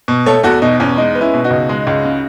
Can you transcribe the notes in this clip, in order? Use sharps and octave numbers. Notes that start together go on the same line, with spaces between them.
B2
A3 A4 C#5
E2 F#4 A4
B2 D#4
E2 C#4
G#3 D#4
B3
C#4 E4
B2
D#4 F#4
C#2
G#3
C#2
C#3